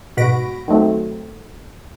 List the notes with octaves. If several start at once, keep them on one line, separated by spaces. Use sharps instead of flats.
G#2 B2 F#4 B5 A#6 D7
D#3 F#3 A3 C4